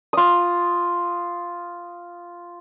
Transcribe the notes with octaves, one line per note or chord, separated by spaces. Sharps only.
F4 D#6